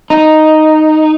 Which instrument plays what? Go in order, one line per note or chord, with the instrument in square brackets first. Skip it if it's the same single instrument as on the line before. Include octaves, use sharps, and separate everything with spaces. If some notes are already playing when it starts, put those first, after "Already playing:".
[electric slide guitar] D#4